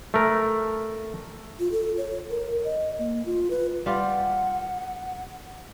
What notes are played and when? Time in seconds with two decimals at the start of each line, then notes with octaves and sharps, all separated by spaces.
0.14 A3 A#4
1.59 F4
1.72 A4
1.97 C#5
2.30 A#4
2.65 D#5
2.99 A#3
3.25 F4
3.50 B4
3.86 G3 F4 G4 F#5